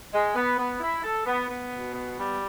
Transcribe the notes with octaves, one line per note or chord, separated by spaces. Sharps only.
G#3
B3
B3
E4
A4
B3
B3
B2
B3
G3